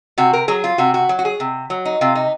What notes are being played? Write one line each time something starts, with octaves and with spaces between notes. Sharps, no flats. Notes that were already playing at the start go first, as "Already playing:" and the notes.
C3 F#4
A#4
F#3 G#4
F4
C3 F#4
F#4
F#3
F#4
G#4
C3
F#3
D#4
C3 F4
D#4